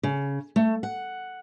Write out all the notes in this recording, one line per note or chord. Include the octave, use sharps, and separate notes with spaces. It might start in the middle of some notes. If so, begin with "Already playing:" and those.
C#3
A3
F#5